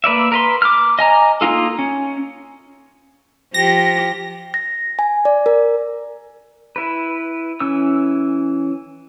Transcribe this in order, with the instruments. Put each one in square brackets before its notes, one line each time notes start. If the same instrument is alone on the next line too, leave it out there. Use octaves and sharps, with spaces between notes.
[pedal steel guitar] A#3 B4 D5 E5
A#4 B4 C6
D6 F6
D#5 G#5 A#5
A#3 C#4 D#4 F4 A4
C#4
[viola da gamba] F3 G4 [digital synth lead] A#6
[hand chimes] A#6
G#5
D5
A#4
[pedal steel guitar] E4 B4
E3 C#4 E6